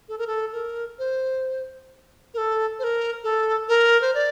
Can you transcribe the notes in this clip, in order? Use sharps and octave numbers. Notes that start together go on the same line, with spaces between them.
A4
A#4
A4
A#4
C5
A#4
A4
C5
A#4
A4
A#4
C5
D5